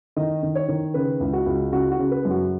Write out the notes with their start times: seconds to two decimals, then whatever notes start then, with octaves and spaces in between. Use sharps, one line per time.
0.16 D#3 D#5
0.43 D#3
0.55 C#5
0.68 D#3
0.94 C#3 B4
1.20 C#2
1.33 F#4
1.46 C#2
1.72 C#3 F#4
1.91 F#4
1.99 C#3
2.11 B4
2.25 F#2
2.31 F#4